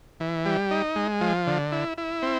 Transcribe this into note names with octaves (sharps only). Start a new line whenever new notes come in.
E3
G3
D#4
G#3
F3
D3
E4
E4
C4